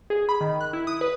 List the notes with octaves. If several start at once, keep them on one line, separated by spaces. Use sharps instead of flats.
G#4
B5
D#3
F#6
E4
D#6
B4